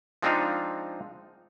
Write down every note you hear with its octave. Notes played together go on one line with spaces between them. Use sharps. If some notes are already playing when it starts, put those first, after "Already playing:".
F3 G#3 C4 D4 D#4 F4